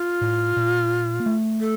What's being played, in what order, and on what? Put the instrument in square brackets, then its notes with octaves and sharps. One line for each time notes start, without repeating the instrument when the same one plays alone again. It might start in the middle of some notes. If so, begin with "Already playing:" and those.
Already playing: [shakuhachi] F4
[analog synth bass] A2
A#2
A#3
A3
[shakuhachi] A4